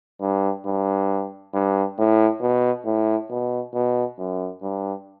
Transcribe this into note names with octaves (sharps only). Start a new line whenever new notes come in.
G2
G2
G2
A2
B2
A2
B2
B2
F#2
G2